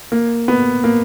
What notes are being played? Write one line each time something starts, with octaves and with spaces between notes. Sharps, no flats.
A#3
B3
A#3